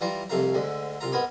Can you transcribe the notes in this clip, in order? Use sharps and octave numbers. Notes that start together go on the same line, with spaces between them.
E3 G3 F4 A#5
C2 F2 C3 A3 F5 A#5
D2 G#2 D3
C2 F4 A#5
G#2 B3 A#4 G#5 B5 D6